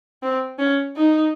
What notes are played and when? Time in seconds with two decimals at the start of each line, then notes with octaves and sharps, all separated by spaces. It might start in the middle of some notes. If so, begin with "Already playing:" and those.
0.23 C4
0.59 C#4
0.96 D#4